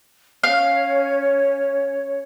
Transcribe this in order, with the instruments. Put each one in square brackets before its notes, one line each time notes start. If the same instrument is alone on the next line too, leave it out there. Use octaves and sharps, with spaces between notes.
[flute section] C#4 C#5 [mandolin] F5